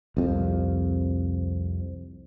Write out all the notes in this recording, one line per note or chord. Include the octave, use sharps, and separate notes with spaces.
C2 F2